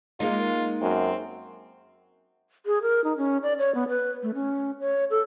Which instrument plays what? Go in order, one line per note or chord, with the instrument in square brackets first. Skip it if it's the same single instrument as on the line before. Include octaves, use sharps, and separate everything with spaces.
[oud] G#3 A#3 D#4 [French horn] F4
[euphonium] F#2 [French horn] C4
[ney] G#4
A#4
D#4
C#4
D5
C#5
B3
B4
A3
C#4
C#5
A4